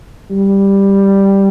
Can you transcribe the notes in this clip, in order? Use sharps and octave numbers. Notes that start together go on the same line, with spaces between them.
G3